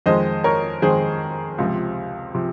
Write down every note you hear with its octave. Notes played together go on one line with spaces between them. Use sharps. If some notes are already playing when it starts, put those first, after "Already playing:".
F2 D#3 G#3 C5 D#5
A#4 C#5
F2 D#3 G#3 G#4 C5
C#2 C3 F3
C3 F3